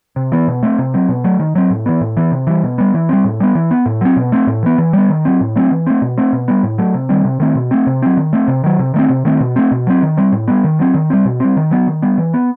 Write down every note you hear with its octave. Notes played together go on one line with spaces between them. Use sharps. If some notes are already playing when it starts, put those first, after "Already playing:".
C3
E3 B3
B2
A3 C4
C3
F#3 C4
B2
F#3 A3
D#3
F#3 C4
A2
E3 B3
A2
E3 B3
C3
E3 G3
B2
G3 B3
E3
G3 C4
A2
G3 B3
E3
B3
A2
F#3 C4
B2
A3 C4
A2
E3 B3
E3
G3 B3
D#3
F#3 C4
A2
F#3 A3 C4
E3
A3 C4
B2
A3 C4
B2
G3 B3
A2
F#3 A3
C3
D#3 G3 C4
C3
D#3 A3 C4
B2
A3 C4
C3
F#3 C4
D#3
A3 C4
C3
D#3 F#3
C3
D#3 A3 C4
C3
D#3 A3 C4
B2
A3 C4
B2
F#3 C4
D#3
G3 C4
A2
G3 B3
D#3
F#3 C4
D#3
G3 C4
B2
G3 C4
D#3
F#3 B3
D#3
G3 B3
E3
B3